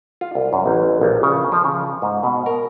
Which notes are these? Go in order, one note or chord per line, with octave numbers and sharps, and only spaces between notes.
F4
C2
F#2
A1
A#1
C#3
F3
C#3
G#2
B2
A#4